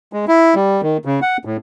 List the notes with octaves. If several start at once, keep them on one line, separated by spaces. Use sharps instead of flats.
G#3
E4
G3
D#3
C#3
F#5
A2